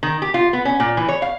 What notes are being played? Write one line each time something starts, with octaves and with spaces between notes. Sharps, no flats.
D#3
G4
F4
B3
C#4
A#2
E3
C#5
F5